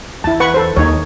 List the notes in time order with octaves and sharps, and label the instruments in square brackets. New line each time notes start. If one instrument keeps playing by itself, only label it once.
[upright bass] E2 [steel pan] E4 A5
[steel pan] B4 F#5 C#6
A4 C5
[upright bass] D#2 [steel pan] D#4 C#5